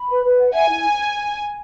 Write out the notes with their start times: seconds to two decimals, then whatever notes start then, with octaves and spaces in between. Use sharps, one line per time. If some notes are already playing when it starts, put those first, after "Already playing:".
Already playing: B5
0.09 B4
0.23 B4
0.39 F#5
0.53 E5 G#5
0.68 E4